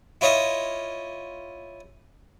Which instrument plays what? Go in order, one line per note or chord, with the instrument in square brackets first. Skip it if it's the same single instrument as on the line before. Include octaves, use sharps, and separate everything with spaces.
[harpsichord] E4 F4 C#5 D#5 E5